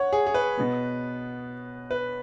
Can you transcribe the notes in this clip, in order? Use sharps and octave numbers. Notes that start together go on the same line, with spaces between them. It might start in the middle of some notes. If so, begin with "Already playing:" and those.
Already playing: C#5 F#5
G#4
G#4
B4
B2 B3
B4